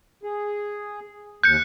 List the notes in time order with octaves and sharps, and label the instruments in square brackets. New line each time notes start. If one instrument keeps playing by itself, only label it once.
[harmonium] G#4
[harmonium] D#2 [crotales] F#6 C#7 [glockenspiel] G6